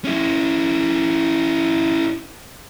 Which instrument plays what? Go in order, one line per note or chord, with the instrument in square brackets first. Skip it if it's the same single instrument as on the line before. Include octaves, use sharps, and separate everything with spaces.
[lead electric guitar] C#4 E4